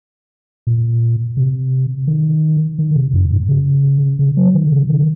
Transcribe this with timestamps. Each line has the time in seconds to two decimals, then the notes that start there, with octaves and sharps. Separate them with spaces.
0.67 A#2
1.37 C3
2.07 D#3
2.79 D#3
2.95 C3
3.13 F#2
3.31 G#2
3.49 C#3
4.19 C#3
4.37 F#3
4.54 D#3
4.72 C#3
4.90 D#3